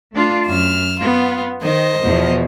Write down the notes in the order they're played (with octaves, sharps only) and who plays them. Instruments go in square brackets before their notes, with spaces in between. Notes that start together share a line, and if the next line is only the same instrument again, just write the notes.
[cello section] A3 D4 F4
[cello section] F#2 [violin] F6 E7
[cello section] B3 [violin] F4
[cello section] D#3 [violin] C5 D#5
[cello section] E2 B2 F3